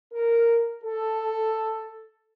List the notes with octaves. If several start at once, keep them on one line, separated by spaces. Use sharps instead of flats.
A#4
A4